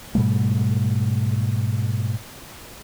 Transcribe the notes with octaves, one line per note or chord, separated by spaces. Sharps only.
G#2 B2 G3 A3